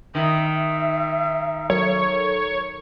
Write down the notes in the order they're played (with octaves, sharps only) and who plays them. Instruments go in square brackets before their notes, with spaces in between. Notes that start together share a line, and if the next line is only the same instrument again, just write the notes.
[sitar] D#3 [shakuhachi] E5
[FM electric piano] F#3 A4 A#4 [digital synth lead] C#5